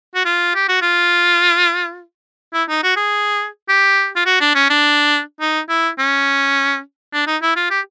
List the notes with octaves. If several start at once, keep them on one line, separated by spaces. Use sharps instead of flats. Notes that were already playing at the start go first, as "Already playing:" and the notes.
F#4
F4
G4
F#4
F4
E4
D#4
F#4
G#4
G4
F4
F#4
D4
C#4
D4
D#4
E4
C#4
D4
D#4
E4
F4
G4